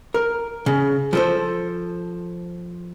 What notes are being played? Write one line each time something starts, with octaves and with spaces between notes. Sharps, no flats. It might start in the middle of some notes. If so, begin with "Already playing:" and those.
A#4
C#3
F3 A4 C5